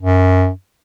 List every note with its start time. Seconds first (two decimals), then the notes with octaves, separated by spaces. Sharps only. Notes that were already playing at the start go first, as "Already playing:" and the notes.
0.02 F#2